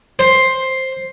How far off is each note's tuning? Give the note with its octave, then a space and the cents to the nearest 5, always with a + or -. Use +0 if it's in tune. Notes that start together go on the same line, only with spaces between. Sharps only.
C5 +5